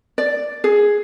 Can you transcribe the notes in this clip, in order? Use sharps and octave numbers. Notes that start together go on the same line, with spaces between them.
D5
G#4